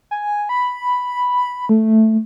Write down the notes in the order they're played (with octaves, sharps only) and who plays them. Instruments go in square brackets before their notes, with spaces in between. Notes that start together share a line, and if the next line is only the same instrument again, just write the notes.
[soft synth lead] G#5
B5
A3